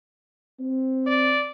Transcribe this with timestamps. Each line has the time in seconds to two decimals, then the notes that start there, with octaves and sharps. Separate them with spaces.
0.60 C4
1.07 D5